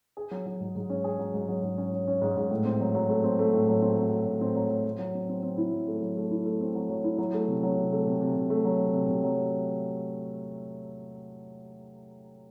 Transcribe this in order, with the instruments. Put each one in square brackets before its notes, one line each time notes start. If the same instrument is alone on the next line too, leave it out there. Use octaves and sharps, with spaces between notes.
[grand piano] G#4
F#3
F#3
G#2
G#2
C#4
G#4
F#3
G#2
F#3
G#2
C#4
C#4
C#4
G#2
G#2
A2
C4
F#3
F#3
A3
C4
A3
A2
F#3
C4
F#3
F#3
A2
C4
F#3
F#3
F#3
F#3
C4
C4
C4
E4
F#3
A3
F#3
A3
E4
A3
C4
F#3
F#3
E4
F#3
A3
C3
F#3
C3
A3
C3
C3
C3
A3
F#3
C3
C3
C3
F#3